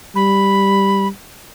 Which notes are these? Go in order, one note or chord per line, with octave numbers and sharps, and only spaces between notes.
G3 B5